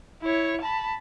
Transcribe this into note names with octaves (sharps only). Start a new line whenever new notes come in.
E4 C#5
A5 B5